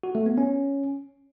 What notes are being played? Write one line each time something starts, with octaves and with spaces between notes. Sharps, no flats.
F#4
A3
B3
C#4